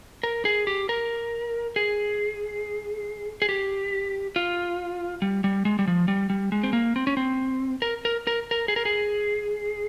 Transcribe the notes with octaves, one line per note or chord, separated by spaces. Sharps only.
A#4
G#4
G4
A#4
G#4
G#4
G4
F4
G3
G3
G#3
G3
F3
G3
G3
G#3
C4
A#3
C4
C#4
C4
A#4
A#4
A#4
A#4
G#4
A#4
G#4